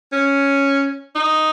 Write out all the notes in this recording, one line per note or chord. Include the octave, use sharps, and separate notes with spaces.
C#4
D#4